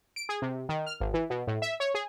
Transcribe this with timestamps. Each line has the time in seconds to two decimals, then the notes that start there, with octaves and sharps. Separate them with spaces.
0.16 D7
0.29 G#4
0.42 C3
0.69 D#3
0.86 F6
1.00 G#1
1.14 E3
1.30 B2
1.47 A2
1.62 E5
1.80 C#5
1.95 G#4